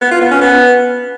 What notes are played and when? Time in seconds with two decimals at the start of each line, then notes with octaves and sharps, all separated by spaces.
0.01 B3
0.11 F4
0.21 B3
0.31 C#4
0.41 B3